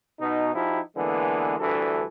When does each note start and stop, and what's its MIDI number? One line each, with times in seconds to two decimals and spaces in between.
0.20 0.54 47
0.20 0.54 63
0.54 0.80 53
0.54 0.80 63
0.54 0.80 64
0.54 0.80 66
0.54 0.80 67
0.96 1.58 50
0.96 1.58 52
0.96 1.58 56
0.96 1.58 58
0.96 1.58 59
1.59 2.05 38
1.59 2.05 43
1.59 2.05 52
1.59 2.05 69